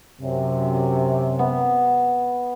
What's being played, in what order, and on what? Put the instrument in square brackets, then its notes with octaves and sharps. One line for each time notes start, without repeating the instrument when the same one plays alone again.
[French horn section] F#2 C3
[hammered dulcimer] B3